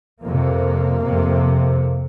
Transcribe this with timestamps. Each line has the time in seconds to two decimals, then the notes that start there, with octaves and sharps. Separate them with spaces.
0.22 F2 C3 A#3
1.02 F2 C3